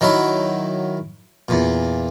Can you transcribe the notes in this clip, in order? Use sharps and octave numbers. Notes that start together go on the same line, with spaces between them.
D#3 F#3 E4
E2 A#2